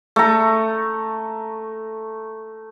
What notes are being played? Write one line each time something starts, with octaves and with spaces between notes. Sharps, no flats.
A3 A#5